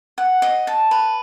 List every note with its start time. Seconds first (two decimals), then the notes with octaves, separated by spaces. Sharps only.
0.18 F#5
0.42 D#5
0.67 A5
0.91 B4